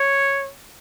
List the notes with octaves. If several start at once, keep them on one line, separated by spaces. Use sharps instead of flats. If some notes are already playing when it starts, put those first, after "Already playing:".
Already playing: C#5